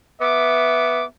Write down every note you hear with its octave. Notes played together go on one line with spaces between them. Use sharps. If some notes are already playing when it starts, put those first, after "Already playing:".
B3 E5 D6